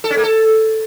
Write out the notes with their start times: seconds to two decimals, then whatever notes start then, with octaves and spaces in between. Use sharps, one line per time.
0.04 A4
0.10 C#4
0.17 A#3
0.23 A4